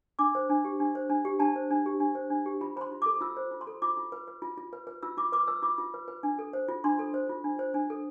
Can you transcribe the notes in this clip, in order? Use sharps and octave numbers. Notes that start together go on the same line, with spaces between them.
D4 D6
C5
D4
G4
D4
C5
D4
G4
D4 A5
C5
D4
G4
D4
C5
D4
G4
F4 B5
C5 B5 C6
F4
A4 D6
F4 E6
C5
F4
C6
A4
F4 D6
F4
B4
B4
F4
F4
B4
B4
F4 E6
F4 D6
B4 D6
B4 E6
F4 D6
F4
B4
B4
D4
A4
C5
F4
D4 C6
A4
C5
F4
D4
C5
D4
A4